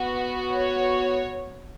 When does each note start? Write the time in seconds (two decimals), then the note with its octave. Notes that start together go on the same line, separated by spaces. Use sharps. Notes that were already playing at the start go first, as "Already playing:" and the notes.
Already playing: B3 F#4
0.55 C#5